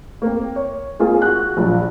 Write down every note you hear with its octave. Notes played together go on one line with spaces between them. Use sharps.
A#3 C4
C#5
G#3 A#3 C4 F4 G#4
F#4 F#6
A#1 F#3 G3 F4